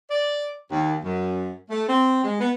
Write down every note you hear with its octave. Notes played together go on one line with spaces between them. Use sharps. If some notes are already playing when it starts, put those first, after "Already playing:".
D5
D#2
F#2
A3
C4
G#3
B3